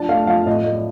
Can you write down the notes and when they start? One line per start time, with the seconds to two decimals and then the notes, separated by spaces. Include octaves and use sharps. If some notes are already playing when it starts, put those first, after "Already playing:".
Already playing: F3 D4 A5
0.09 A3 F5
0.27 F3 F5
0.46 A2 D#5
0.64 A3 D#5
0.74 D5